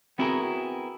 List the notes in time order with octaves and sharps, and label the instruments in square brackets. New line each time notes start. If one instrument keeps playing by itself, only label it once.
[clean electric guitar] B3 C4 E4 F#4 G#4 A#4